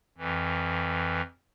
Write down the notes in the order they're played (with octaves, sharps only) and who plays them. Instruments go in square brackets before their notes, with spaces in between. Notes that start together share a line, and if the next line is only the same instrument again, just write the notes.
[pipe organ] F2 E3